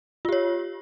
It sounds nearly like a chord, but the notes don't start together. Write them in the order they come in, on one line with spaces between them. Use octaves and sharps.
F4 G4 C#5